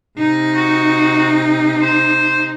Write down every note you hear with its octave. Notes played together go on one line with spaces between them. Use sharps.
C3 D#4
F#4
C5